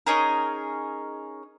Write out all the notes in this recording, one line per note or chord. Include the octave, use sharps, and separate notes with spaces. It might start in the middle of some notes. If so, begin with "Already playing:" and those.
C#4 D#4 G#4 A#4